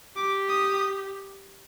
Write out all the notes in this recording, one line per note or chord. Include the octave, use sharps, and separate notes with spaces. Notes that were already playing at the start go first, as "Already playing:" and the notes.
G4 D6
D#6